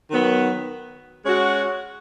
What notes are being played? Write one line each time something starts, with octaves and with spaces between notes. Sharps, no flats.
D#3 F#3 B3
G#3 C#4 F#4